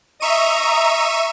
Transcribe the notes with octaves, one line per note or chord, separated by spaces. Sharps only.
D#5 E5 A#5 C#6 D#7